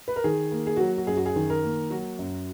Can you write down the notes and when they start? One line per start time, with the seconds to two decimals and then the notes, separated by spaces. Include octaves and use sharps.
0.08 B4
0.16 A#4
0.24 D#3 G#4
0.52 A#3
0.67 G#4
0.77 F#3 F#4
0.97 F#4
1.07 F#2 G#4
1.17 F#4
1.26 G#4
1.36 D#3
1.50 A#4
1.64 A#3
1.90 F#3 F#4
2.19 F#2